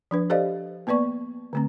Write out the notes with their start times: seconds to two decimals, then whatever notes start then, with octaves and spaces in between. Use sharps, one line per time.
0.11 F3 D4 B4
0.30 G4 A4 C5 D5 D#5 F5
0.87 A#3 B3 B4 D5 C#6
1.53 D3 A3 C4